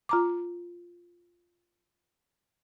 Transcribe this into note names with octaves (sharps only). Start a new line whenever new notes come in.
F4 A#5 D6